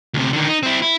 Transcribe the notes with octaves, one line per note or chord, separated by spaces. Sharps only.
D2 C3
D3 D#3
D#4
C4 E4
E4